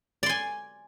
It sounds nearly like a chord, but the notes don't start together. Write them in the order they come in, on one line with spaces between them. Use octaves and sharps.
D5 C6 G#5